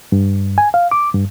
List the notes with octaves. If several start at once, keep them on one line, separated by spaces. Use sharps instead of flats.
G2
G#5
F5
D6
G2